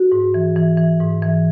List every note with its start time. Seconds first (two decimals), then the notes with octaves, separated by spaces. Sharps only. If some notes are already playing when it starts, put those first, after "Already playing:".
Already playing: F#4
0.12 G#2
0.34 E3
0.57 E3
0.77 E3
1.00 G#2
1.22 E3